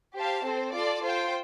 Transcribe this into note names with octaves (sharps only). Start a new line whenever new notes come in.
G4 C5 F5 A5
C4 A4 C5
F4 A4 D5
F4 C5 G5